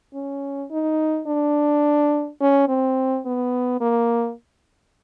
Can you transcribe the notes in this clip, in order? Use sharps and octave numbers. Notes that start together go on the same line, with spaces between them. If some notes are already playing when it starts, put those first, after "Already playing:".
C#4
D#4
D4
C#4
C4
B3
A#3